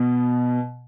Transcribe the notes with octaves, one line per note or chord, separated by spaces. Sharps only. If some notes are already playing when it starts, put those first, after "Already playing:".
Already playing: B2